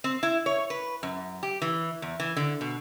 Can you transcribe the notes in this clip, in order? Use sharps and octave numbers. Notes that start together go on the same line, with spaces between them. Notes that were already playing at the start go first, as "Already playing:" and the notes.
C4
E4
C#5
B4
F#2
G4
E3
E2
E3
D3
B2